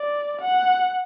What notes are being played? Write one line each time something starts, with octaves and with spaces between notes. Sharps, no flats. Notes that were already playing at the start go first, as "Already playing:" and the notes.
Already playing: D5
F#5